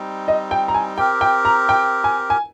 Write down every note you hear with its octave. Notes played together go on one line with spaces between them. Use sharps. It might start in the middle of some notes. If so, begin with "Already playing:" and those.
Already playing: G3 C4 D#4
D#5
G5
A#5
G#5
C4 G4 A#4 G5
G5
A#5
G5
G#5
G#5